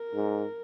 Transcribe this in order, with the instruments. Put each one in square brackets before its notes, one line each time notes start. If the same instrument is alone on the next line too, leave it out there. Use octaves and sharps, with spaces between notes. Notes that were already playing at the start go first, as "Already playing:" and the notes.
Already playing: [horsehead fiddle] A#4
[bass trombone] G#2